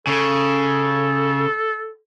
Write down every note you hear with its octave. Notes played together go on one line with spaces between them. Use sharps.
C#3 A4